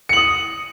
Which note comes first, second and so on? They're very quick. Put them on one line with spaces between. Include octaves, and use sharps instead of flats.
C#7 F#7 D#6